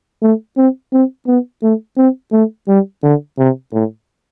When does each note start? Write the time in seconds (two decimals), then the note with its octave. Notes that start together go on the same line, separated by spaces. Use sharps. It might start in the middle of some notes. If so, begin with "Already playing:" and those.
0.22 A3
0.57 C4
0.93 C4
1.27 B3
1.63 A3
1.97 C4
2.33 A3
2.68 G3
3.03 D3
3.38 C3
3.73 A2